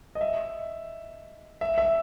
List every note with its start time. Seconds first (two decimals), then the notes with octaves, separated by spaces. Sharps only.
0.15 D#5
0.21 E5
1.61 E5
1.78 E5